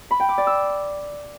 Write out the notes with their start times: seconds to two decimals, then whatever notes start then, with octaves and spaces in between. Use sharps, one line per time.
0.11 B5
0.20 G5
0.29 D6
0.38 D5
0.47 E6